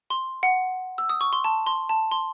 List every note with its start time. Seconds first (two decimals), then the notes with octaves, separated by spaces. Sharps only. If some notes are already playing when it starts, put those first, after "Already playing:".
0.10 C6
0.43 F#5
0.98 E6
1.09 D#6
1.21 C#6
1.33 C6
1.44 A5
1.67 C6
1.89 A5
2.11 C6